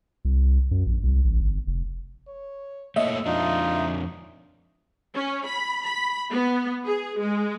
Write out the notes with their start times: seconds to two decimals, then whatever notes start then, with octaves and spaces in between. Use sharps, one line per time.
0.25 C2
0.71 F#2
0.87 A#1
1.03 C2
1.25 A1
1.40 G1
1.67 F1
2.28 C#5
2.96 A3 A#3 C#5 D#5 E5
3.26 F2 D4 D#4 F4
5.14 C#4
5.46 B5
5.84 B5
6.31 B3
6.85 G#4
7.20 G#3